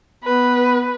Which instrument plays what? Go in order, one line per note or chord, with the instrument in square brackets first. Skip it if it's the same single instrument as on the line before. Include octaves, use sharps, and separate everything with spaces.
[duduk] B3 [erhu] B4